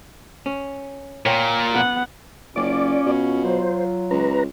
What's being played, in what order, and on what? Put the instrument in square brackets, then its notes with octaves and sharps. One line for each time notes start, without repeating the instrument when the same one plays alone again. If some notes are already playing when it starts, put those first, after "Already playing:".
[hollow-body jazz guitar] C#4
[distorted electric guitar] A#2 [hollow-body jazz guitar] C#5 G5
[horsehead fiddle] B3 F#5
[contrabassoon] F#1 [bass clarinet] C#4 [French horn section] F4 [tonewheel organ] D5 D6
[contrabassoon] B2
[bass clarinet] F#3 [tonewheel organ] C5
[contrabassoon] C#2 [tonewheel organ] B4 A#5